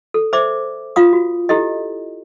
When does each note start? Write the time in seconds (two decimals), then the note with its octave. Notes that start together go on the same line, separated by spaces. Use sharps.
0.14 A4
0.33 C5 D5 E5 D6
0.96 F4 F5 D#6
1.13 F#4
1.49 E4 G4 A4 D#5